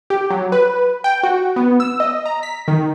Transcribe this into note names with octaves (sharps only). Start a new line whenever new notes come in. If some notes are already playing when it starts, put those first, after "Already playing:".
G4
F#3
B4
G5
F#4
B3
E6
D#5
A#5
B6
D#3